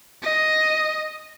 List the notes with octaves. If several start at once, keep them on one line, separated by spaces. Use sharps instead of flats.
D#5